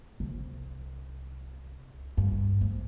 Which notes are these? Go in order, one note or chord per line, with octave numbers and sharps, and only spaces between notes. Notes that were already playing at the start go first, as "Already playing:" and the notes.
C2
G2
G#2